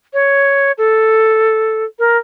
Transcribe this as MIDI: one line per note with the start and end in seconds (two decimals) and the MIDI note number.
0.13 0.72 73
0.78 1.84 69
1.99 2.17 70